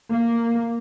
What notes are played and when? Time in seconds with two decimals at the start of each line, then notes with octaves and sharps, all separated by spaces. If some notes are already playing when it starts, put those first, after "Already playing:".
0.13 A#3